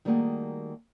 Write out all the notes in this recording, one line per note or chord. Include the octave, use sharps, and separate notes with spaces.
D#3 G3 A3 A#3 F#4 G#4